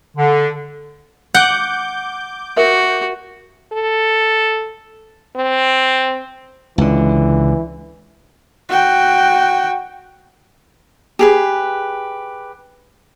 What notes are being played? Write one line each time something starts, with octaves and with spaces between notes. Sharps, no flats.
D3
F#5 D6 G6
F#4 A#4 E5
A4
C4
C#2 D3 E3
F#4 G5
G4 G#4 B4